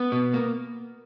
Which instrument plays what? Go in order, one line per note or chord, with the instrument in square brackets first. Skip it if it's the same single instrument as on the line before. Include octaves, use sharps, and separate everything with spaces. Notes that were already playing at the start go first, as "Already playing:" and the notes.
Already playing: [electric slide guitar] B3
B2
A#3